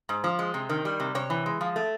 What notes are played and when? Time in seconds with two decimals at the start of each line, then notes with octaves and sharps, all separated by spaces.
0.09 G#2
0.24 F3
0.39 G#3
0.54 C3
0.69 D#3
0.85 G3
1.00 C3
1.15 C3 C#5
1.30 E3
1.46 G#3
1.61 F3
1.76 A3